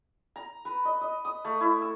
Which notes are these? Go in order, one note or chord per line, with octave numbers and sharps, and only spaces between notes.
A#5
B4
D#5
D#5
D#6
A3
E4
E6